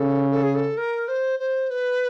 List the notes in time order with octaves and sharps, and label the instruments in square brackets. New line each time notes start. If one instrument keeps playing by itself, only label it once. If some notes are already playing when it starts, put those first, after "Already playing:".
Already playing: [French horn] C#3 [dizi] A4
[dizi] A4
G#4
A4
A#4
C5
C5
B4